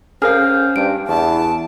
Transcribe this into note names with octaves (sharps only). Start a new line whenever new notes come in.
C#4 G#4 A#4 C5 F5 F6
G2 D7
E2 A5